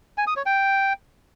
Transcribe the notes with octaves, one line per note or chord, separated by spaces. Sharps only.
G#5
D#6
C#5
G5